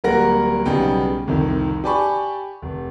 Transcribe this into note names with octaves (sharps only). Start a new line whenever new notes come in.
D1 G3 A#3 A#4 F#5 A#6
B1 C#3 G3 B3 G#4 G5
C2 F2 D#3
G4 D5 G#5 A5 B5 C#6
F1